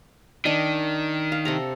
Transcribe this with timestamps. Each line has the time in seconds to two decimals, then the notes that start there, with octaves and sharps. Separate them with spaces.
0.45 D#3 D4 D#5
1.32 F5
1.45 C3 A4 A#5